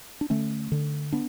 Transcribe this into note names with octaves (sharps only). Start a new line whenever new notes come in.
D4
D3 A3 C#4
D3
B3 D4